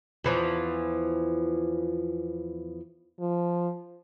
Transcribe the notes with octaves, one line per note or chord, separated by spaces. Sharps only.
E2 E3 F3
F3